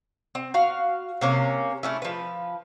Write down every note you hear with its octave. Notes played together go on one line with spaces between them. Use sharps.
C4
F#4 F5
C3 A#3 C#4
A3 C#4 E4
F3 B4